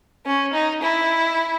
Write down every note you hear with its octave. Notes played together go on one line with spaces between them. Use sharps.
C#4
D#4
E4